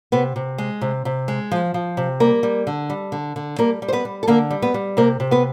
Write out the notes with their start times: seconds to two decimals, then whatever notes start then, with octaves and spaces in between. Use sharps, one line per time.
0.12 C3 B3 B4
0.36 C3
0.58 G#3
0.81 C3
1.05 C3
1.28 G#3
1.51 F3
1.74 F3
1.97 C3
2.20 G3 A#3 A#4
2.43 G3
2.67 D3
2.90 G3
3.12 D3
3.36 D3
3.58 G3 A#3 A#4
3.82 G3
3.88 C5
3.93 B3 B4
4.05 G3
4.23 A4
4.27 D3 A#3 A#4
4.51 G3
4.62 B3 B4
4.74 G3
4.97 C3 A#3 A#4
5.20 C3
5.31 B3 B4